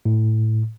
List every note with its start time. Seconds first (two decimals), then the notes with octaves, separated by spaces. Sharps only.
0.05 A2